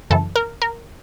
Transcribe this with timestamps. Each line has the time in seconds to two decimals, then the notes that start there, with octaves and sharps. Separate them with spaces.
0.10 F#2 C#3 E3 A4
0.36 A#4
0.62 A#4